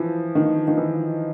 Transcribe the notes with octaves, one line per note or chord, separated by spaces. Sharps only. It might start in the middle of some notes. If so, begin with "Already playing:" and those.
Already playing: E3 F3
D#3
D#3
E3